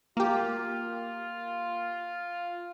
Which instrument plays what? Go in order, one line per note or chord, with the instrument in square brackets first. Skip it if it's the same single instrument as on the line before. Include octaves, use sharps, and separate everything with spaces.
[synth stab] A#3 G4 [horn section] F4